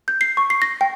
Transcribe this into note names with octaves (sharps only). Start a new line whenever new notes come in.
G6
C7
C#6
C7
A#6
G5